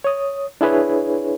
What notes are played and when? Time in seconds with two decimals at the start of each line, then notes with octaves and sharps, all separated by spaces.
0.04 C#5 D#6
0.61 D4 E4 G#4 B4 C#5